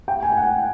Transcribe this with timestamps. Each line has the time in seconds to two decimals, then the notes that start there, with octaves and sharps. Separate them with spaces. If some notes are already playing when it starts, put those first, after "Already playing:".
0.08 G5
0.22 G#5
0.37 F#5